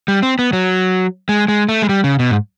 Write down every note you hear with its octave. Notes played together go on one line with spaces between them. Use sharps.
G3
C4
B3
F#3
G#3
G#3
A3
G#3
G3
C#3
B2
G#2